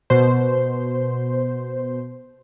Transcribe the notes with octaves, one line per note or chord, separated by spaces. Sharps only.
B2 C5